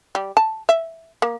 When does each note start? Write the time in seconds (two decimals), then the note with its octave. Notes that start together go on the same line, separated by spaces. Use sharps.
0.15 G3
0.37 A5
0.69 E5
1.22 A#3